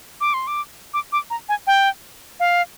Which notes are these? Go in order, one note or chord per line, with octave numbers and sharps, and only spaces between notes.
D6
C6
D6
D6
D6
A#5
G#5
G5
F5